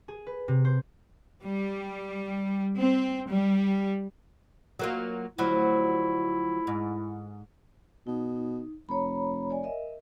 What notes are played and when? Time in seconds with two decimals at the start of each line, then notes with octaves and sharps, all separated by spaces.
0.08 G#4
0.27 B4
0.48 C3
0.65 C5
1.43 G3
2.76 C4
3.29 G3
4.79 F#3 A#3 F4
5.38 D2 F3 F#3 E4
6.67 G#2
8.07 B2 D#4
8.36 D#4
8.89 F1 C#5 A#5 B5
9.49 C#5 D5 G#5
9.63 A#4 D#5 E5